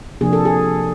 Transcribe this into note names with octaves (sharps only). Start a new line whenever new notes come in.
C3 F3 A#3 D4 G#4
A4
G#4